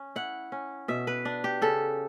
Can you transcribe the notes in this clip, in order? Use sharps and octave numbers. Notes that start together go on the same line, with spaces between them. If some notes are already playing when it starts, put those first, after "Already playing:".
Already playing: C#4
E4 F#5
C#4
B2 E5
B4
D4
G4
C#3 A4